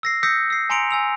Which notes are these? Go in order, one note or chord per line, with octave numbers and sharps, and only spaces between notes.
E6 A#6 C7
D#6 E6 G6 A#6 B6 C#7
E6 C7
G#5 A#5 C6 C#7 D7 F7
G#5 E6 F7